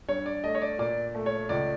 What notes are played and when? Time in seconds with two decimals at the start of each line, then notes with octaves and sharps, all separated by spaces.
0.08 G2 C#5
0.26 D5
0.44 A3 D#5
0.55 C#5
0.62 D5
0.79 A#2 D5
1.14 A3
1.26 C#5
1.49 C#2 D5